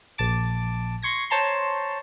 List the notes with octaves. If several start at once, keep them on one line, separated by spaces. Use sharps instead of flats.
A#1 A5 D6
C6 C#6 G#6 A#6
C5 C#5 A5 A#5 C6